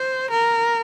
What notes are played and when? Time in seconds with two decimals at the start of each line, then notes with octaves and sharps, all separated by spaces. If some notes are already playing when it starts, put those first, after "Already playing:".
Already playing: C5
0.31 A#4